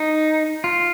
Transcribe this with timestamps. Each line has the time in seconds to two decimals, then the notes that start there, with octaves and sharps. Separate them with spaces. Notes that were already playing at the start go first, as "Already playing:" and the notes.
Already playing: D#4
0.64 F4